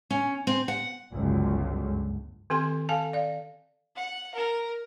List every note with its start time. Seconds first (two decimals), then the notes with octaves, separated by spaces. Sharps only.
0.10 C#4
0.47 C4
0.68 F#5
1.13 G1 C#2 F#2
2.50 D#3 C4 G4 A4 G#5 C6
2.89 A4 F5 G#5 A5
3.13 D5 F5
3.96 F#5
4.34 A#4